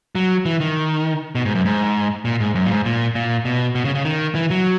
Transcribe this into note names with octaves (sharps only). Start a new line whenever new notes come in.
F#3
E3
D#3
B2
G#2
F#2
G#2
A#2
G#2
F#2
A#2
G#2
A#2
A#2
B2
B2
C#3
C#3
D#3
E3
F#3